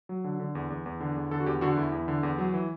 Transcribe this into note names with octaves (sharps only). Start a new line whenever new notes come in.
F#3
D3
D3
E2
E2
E2
D3
E2
D3 A4
F#4
E2 G4
D3 F#4
E2 E4
E2
D3
E2
F#3
E3